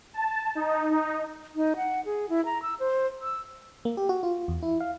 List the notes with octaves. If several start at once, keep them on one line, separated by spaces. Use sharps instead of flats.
A5
D#4
D#4
D#4
F#5
G#4
E4
A#5
E6
C5
E6
A#3
G4
F#4
F4
E2
E4
F5